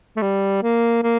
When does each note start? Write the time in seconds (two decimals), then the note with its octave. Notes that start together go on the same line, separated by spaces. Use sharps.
0.16 A3
0.22 G3
0.63 A#3
1.03 A#3